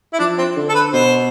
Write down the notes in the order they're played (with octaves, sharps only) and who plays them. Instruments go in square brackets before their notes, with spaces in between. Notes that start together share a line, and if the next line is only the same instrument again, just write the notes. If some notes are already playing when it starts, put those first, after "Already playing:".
[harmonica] E4
[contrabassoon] F3 [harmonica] D4
[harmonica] C4
[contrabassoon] D3
[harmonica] A4
B4
[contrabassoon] B2 [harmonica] C5